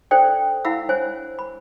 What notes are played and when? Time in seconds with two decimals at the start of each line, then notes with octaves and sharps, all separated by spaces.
0.11 D4 A4 C5 D5 G5
0.65 E4 F5 F#5 B5 E6
0.89 D4 C5 C#5 G#5
1.39 B5